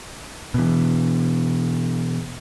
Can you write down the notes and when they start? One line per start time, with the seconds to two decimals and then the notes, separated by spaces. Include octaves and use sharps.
0.54 B2 E3